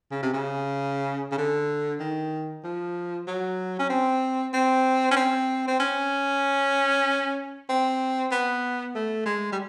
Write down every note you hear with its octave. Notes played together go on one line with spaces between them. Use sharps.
C#3
C3
C#3
C#3
D3
D#3
F3
F#3
C#4
C4
C4
C#4
C4
C4
C#4
C4
B3
A3
G#3
G3